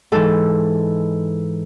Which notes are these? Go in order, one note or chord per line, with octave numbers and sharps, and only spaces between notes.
G#2 E3 A4